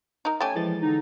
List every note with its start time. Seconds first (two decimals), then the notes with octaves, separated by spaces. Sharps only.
0.25 D#4 A#4
0.40 A3 C#4 G4 G#5 A5
0.55 E3 F3 G#3 A6
0.82 D3 D#4